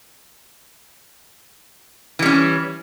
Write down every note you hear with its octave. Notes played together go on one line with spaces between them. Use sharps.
E3 G3 C#4